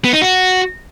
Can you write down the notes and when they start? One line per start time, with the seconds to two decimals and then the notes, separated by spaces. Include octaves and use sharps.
0.04 B3
0.13 D#4
0.22 F#4